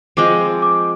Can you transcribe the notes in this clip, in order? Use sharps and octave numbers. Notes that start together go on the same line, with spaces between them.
F3 G#3 C4 D6
D6